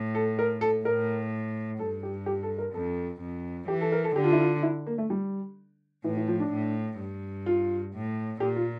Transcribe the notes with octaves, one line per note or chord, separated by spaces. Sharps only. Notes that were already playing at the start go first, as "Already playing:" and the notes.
Already playing: A2
A4
A#4
A4
A2 A#4
G2 A4
G4
G4
A4
A#4
F2 A4
F2
E3 G4
A4
A#4
A4
D3 G4
F4
E4
F4
E4
A#3
A3
G3
A2 E3
E3
F3
D4
A2
G2
F4
A2
A#2 G4
F4